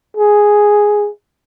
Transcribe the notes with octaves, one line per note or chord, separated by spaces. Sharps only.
G#4